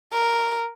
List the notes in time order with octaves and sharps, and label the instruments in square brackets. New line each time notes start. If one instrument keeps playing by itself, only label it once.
[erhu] A#4